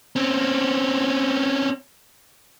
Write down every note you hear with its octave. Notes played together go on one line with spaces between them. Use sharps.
C4 C#4